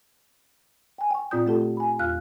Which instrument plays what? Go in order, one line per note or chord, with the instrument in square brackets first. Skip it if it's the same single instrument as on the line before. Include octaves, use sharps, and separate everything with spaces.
[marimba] G5 G#5
G5 C#6
A#2 C4 F4 D5 D#6 G6
A3 F4 G4 A4 A5
G#5 B5
E2 F4 F5 F6 F#6